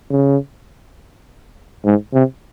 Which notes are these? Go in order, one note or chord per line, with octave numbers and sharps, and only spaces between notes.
C#3
G#2
C3